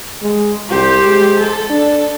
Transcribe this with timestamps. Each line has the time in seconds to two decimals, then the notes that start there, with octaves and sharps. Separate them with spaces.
0.22 G#3
0.70 C2 G4 C5
1.06 G#3
1.39 A4
1.70 D4